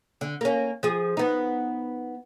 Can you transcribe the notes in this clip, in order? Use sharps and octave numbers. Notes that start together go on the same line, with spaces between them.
D3
A#3 C#4
F3 G#4
B3 D#4